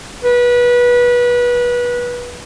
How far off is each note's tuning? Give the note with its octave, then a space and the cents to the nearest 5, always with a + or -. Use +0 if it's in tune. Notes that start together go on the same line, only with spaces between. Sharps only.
B4 -25